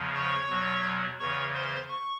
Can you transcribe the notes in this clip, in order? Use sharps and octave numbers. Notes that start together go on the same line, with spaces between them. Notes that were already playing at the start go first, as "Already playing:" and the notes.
Already playing: E2 C#3 F3
C#5 C#6
E2 B2 F#3
E2 C#3 E3 C#5 C#6
C5 C6
C#6